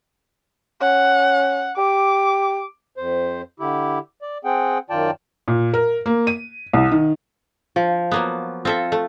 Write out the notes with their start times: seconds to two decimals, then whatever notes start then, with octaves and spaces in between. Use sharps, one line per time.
0.82 C#4 F#5
1.78 G4 D6
2.96 F2 C5
3.60 D3 E4 G4
4.22 D5
4.44 C4 G#4 F#5 G5
4.90 F#2 D#3 F4 D5 G5 A5
5.48 A#2
5.74 A#4
6.06 A#3
6.27 D#7
6.73 C2
6.91 D#3
7.76 F3
8.11 F#3 A#3 B3
8.65 C4 F4 A4 E5
8.92 A3